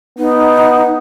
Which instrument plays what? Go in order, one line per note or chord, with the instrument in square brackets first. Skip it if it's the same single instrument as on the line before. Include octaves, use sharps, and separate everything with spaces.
[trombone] B3 [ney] D#4